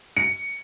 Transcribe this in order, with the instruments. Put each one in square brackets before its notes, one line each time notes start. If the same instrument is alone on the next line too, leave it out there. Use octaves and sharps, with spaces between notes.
[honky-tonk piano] C#7